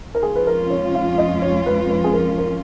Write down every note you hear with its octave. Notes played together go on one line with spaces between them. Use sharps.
A#4
F2 F3 G#3 C#4 F4 G#4
B4
A#4
C#5
F5
D#5
C#5
B4
B4
G#4
A#4
A#4